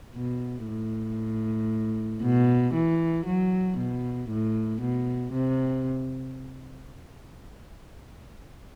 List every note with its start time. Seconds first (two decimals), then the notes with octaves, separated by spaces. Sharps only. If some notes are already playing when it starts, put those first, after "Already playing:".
0.16 B2
0.68 A2
2.23 B2
2.74 E3
3.26 F#3
3.78 B2
4.29 A2
4.81 B2
5.33 C3